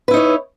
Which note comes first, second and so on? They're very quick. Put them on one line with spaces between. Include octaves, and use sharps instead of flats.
B4 E4 D#4 C#5